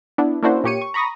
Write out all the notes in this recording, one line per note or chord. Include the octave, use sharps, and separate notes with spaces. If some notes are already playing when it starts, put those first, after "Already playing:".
B3 D4 E4
A#3 C#4 D4 E4 F#4 C5
A#2 A#3 G4 C#5 C#7 D#7
C#6
A#5 B5 C#6 D#6 A#6